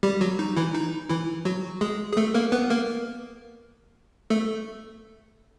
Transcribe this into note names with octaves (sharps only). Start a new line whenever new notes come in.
G3 G4
F#3 F#4
D#4
E3 E4
D#4
E3 E4
F#3 F#4
G#3 G#4
G#4
A3 A4
A#3 A#4
B3 B4
A#3 A#4
A3 A4